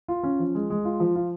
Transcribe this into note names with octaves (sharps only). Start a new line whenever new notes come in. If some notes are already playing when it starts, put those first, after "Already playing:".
F4
C#4
F3
G#3
G#3
F4
F3
F4